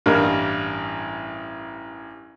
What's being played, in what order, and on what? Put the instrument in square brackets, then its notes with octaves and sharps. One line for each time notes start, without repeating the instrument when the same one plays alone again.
[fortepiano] A1 G2 G3 A#3 D#4 A#4